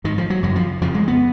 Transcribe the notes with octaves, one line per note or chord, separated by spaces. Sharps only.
G#2 D#3
F3
F#3
F#2 C#3 F#3
F3
F2 C#3 F3
G#3
B3